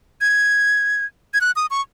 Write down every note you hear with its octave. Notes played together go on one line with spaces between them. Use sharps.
G#6
G#6
F#6
D#6
C#6